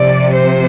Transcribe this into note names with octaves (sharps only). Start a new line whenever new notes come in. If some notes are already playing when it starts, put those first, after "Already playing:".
Already playing: C3 F3 D5
C5